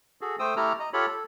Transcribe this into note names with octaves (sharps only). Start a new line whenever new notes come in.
F#4 G#4 A4
A3 C5 G5 D#6 E6
A3 E4 G4 A4 A#5 F6
D#5 A#5
F4 G4 A4 C#5 B5
A4